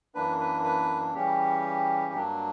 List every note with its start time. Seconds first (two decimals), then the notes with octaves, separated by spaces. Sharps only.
0.15 F#2 E3 A#3 D4 B4
0.40 B4
0.64 B4
1.14 C#3 E3 G3 C#4 G4
2.13 G2 F#3 A#3 D4